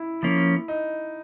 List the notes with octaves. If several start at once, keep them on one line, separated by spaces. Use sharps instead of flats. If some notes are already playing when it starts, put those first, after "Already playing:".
Already playing: E4
F3 A#3 C#4
D#4